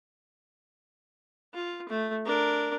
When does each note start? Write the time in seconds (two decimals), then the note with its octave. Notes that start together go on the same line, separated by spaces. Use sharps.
1.53 F4
1.88 A3
2.26 D4 A#4